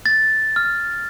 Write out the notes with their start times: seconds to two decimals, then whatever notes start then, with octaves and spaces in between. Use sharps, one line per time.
0.06 A6
0.56 F6